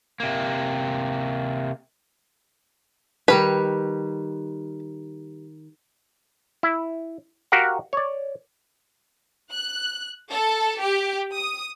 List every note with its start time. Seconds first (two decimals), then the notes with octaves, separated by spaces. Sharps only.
0.20 C3 A#3
3.28 D#3 G3 B4 C#5
6.63 E4
7.52 F#4 G4 A#4 F5 F#5
7.93 C#5 D5
9.51 F#6
10.31 A4
10.79 G4
11.34 D#6